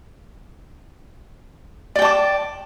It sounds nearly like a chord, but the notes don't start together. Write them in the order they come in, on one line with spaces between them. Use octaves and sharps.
D5 G5 A5 D6